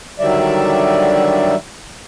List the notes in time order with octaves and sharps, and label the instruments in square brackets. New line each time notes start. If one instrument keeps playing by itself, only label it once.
[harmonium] D3 D#3 F#3 G3 D5 E5